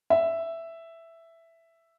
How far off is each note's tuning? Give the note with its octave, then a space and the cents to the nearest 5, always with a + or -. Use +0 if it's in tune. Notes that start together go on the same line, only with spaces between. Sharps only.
E5 +5